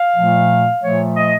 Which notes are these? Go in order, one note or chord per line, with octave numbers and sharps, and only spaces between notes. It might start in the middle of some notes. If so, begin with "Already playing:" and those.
Already playing: F5
A#2 F3 A3
A#2 F3 A3 C#5
D#5